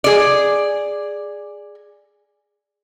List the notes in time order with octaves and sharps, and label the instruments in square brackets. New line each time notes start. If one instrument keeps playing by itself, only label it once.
[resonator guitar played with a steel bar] G#4 D5